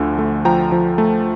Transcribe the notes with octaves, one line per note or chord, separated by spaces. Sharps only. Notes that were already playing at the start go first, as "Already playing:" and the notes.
Already playing: D2 D3 F3
A3
F3 G5 A#5
F3
A3